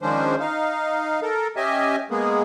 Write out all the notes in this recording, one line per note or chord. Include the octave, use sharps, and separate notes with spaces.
D#3 F3 G#3 C#4 D4 C5
D#4 F5
A4 A#4
C#4 G4 D#5 E5 G#5
G#3 A#3 B3 G#4